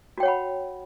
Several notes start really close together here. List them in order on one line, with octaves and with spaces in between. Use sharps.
F#4 G5 C#5 F#5 B5